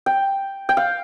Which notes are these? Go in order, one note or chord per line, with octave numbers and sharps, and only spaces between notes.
G5
G5
F5